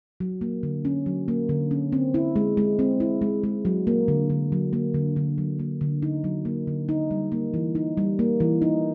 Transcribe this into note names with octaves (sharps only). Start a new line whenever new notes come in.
F#3
A#3
D3
C#4
F#3
A#3
D3
C#4
C4
E4
G#3
G#3
C4
E4
G#3
G#3
F#3
A#3
D3
D3
F#3
A#3
D3
D3
F#3
A#3
D3
D#4
F#3
A#3
D3
D#4
G3
A#3
E3
D#4
G3
A#3
E3
D#4